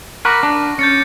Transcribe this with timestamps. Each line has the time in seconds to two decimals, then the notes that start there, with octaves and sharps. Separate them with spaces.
0.25 A#4 F#5 B5 C#6 D6 A#6
0.43 D4
0.79 C#4 G6 A6 C#7